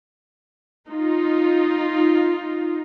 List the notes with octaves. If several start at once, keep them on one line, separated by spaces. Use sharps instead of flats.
D#4 F4